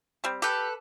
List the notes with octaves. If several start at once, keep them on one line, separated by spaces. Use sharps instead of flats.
G3 C4
G4 A4 B4